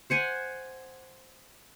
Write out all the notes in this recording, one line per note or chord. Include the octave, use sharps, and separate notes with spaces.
C5 F#5 G#5